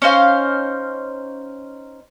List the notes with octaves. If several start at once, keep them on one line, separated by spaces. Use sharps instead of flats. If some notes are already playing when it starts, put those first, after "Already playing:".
C#4 D#4 C5 F5